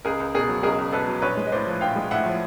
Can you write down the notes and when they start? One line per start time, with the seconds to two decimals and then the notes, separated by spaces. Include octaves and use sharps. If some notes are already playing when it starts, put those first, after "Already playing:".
0.05 C#2 G#4 A#4
0.20 C#2
0.35 B2 G#4 A#4
0.49 F#3
0.63 C#2 G#4 A#4
0.78 C#2
0.93 B2 A4 B4
1.07 F#3
1.22 A#1 B4 C#5
1.37 G#3
1.47 D#5
1.52 A2 C5 D5
1.67 F3
1.81 A#1 F5 G5
1.96 G#3
2.11 A2 E5 F#5
2.26 F3